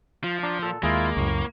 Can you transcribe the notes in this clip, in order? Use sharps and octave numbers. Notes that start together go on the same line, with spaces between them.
F3 F4
D4 A#5
A#2 A4
D#2 G#3 A#3 E4 F4 D#5
C#2 F#2 A2 C#6